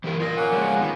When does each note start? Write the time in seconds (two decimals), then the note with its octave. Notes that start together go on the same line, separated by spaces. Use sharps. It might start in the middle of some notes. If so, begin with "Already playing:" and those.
0.04 E3 G4 A#4
0.20 F4 A#4 D#5
0.36 A#3 C#4 F#5
0.52 F3 G#3
0.80 D#3 B3